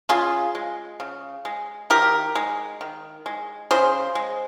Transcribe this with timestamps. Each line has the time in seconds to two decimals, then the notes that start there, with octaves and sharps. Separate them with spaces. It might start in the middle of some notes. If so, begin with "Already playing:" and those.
0.09 C#3 F4 G#4
0.55 G#3
1.00 C#3
1.45 G#3
1.90 D#3 G4 A#4
2.35 G#3
2.81 D#3
3.26 G#3
3.71 C#3 G#4 C5
4.15 G#3